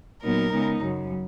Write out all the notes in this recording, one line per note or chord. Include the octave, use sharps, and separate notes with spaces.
A#2 F#3 B3 D#4 A#4
C#3 G#3 B3 D#4
F#2 C#3 F#3